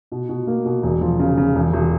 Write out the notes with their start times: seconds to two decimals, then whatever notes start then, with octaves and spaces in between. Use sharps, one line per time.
0.12 B2
0.29 B2
0.47 A#3
0.65 B2
0.83 E1
1.01 F3
1.19 C#3
1.38 C#3
1.55 E1
1.73 E1